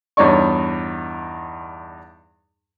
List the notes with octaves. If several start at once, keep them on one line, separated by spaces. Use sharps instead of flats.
E2 G2 D#4 C#5 D5 C#6